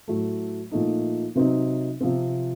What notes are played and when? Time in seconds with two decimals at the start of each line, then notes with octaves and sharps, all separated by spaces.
0.08 A2 F#3 A3
0.71 A#2 F3 A3 D#4
1.35 C3 F#3 C4 D#4
2.01 C3 F3 C4